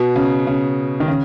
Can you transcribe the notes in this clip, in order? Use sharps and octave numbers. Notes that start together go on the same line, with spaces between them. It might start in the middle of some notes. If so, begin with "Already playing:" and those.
Already playing: B2
C#3
C#3
D#3
C#3